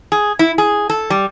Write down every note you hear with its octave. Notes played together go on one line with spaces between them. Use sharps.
G#4
E4
G#4
A4
G3